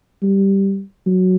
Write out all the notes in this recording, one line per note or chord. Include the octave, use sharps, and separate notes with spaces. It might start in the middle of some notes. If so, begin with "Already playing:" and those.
G3
F#3